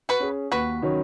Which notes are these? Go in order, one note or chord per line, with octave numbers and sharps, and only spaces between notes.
F#4 B4
C#4 G#4
D#2 F#4 B4
D#3 F#3 C#4